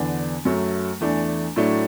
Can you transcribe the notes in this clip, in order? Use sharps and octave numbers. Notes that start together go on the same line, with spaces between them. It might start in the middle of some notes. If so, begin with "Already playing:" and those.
Already playing: E2 D3 B3 D4
F#2 F#3 A3
E2 E3 A3 D4
A2 F#3 A3 D4